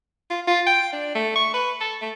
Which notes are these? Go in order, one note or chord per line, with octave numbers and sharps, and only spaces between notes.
F4
F4
G5
D4
A3
C#6
B4
A4
A3